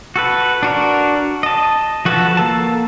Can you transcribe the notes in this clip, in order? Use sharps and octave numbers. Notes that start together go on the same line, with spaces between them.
F#4 A4 B4
D4 F#4 A#4
D#5 A5
F3 F#4 A4 B4 A5
A#3 A4 A5